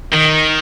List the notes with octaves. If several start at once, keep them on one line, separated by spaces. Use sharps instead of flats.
D#3